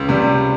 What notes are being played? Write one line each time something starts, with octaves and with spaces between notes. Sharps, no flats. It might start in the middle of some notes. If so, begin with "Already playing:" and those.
Already playing: C#2
C3 G3